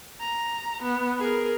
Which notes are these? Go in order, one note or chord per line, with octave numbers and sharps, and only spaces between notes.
A#5
B3
G#4 A#4